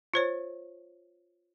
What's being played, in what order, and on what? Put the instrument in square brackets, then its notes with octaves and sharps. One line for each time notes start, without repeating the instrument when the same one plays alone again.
[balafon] F4 C5 C#5